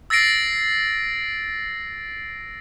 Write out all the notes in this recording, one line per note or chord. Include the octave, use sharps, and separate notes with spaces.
E6 A6 A#6 C7 D7